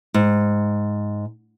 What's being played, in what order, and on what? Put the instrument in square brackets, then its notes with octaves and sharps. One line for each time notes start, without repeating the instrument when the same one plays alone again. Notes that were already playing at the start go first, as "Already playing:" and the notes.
[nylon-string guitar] G#2